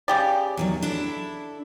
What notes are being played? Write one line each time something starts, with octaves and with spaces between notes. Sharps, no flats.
C#3 G4 D5
E2 D#3 F#3
D4 E4 A4